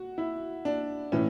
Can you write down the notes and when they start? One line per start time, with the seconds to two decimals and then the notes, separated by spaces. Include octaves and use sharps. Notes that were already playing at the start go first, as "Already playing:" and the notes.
Already playing: F#4
0.18 E4
0.65 D4
1.12 A2 E3 C#4